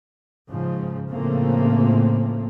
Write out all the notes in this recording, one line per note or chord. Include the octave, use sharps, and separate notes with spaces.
G#2 C#3 F3
A2 C#3 F3 A3 A#3 C4